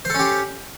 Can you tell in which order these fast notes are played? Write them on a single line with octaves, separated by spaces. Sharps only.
C5 A4 C#4 G4